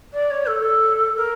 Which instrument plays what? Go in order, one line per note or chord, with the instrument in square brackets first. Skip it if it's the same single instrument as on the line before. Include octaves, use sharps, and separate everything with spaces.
[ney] D5
C#5
A4
A#4